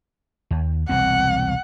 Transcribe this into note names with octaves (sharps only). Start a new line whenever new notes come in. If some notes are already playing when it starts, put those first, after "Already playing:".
D#2
E1 C2 C4 F#5